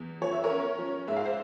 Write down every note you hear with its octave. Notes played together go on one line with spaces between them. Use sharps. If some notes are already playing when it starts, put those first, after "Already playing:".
Already playing: E2
F3 C#5
E5
A#4 C#5
C#4
F3
G#2 E5
F5
C5 E5